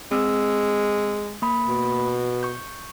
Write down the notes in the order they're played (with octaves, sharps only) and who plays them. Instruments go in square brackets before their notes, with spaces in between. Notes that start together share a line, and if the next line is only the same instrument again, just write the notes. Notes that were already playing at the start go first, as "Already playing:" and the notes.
[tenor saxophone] G#3 [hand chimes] C4 E6
[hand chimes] A#3 B5
[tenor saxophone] B2
[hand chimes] C#6 G6